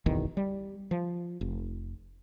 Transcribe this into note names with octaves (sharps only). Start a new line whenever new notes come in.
F#1 B1 E2 D#3
G3
F3
F1